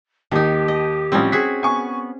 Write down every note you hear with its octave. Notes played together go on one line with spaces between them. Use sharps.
D#2 D#3 D#4 G4
D#5
A1 F3 G3 C4 C#4
F#4 G#4 B6
B3 G#5 C#6